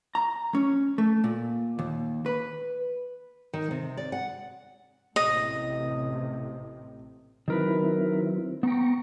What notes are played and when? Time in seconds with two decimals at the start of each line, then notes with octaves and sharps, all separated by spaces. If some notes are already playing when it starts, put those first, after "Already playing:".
0.15 A#5
0.55 C#4
0.98 A3
1.24 A#2
1.79 D#2
2.26 B4
3.53 D#3
3.71 C3
3.97 D5
4.12 F#5
5.16 A1 A2 C3 D#5
7.48 D#3 F#3 C4 E4 A#4 B4
8.63 B3 G5 A#5 C#6